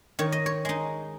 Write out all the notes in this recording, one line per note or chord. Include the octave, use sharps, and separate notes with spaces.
D#3 C#5
D#5
C#5
G#3 D#4